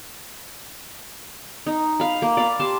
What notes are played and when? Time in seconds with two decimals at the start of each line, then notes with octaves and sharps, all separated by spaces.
1.66 D#4
2.00 F5 B5
2.22 A#3
2.37 D5 F5 B5
2.60 G4 A5 C6